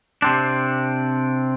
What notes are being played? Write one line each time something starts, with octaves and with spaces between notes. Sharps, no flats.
C3 C4 D4